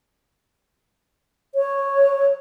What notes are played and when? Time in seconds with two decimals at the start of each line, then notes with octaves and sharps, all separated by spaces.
1.55 C#5